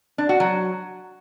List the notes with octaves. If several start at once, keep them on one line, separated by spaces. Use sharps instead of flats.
D4
F#4
F#3